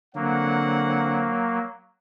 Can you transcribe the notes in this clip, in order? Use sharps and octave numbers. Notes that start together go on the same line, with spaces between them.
D3 F#3 A#3 C4 F#5